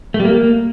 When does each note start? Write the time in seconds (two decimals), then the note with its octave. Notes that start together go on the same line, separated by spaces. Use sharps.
0.14 A3
0.20 G3
0.25 A#3